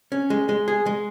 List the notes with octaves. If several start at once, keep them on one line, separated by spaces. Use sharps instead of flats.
C#4
G#3
G#3
G#4
G#3